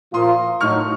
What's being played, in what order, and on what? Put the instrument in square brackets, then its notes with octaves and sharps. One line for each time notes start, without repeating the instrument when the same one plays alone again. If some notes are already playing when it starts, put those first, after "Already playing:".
[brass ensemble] A#2 F3 A#3 F4 [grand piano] C6 D#6
[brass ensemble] A2 F#3 A3 D#4 [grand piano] C#6 F6